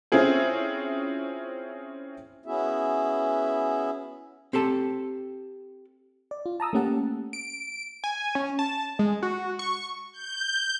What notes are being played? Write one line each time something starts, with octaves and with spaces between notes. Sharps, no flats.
C4 C#4 E4 F4 G#4 C5
B3 C#4 E4 F#4 G#4 E5
C4 G4 A4 A5
D5
F4
A5 A#5 D#6 E6
A3 A#3 C#4 G4 F#5 A5
D7
G#5
C#4
A5
G#3
F#4
C#6
G6